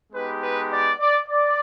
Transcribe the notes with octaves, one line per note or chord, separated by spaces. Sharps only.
G#3 B3 D#4 G4 B4
B4
D5
D5
D5